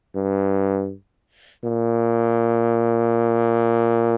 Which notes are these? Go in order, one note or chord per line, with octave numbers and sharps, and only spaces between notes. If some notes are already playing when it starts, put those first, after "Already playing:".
G2
A#2